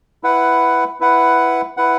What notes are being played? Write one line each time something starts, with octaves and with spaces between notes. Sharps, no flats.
E4 B4 F#5
E4 B4 F#5
E4 B4 F#5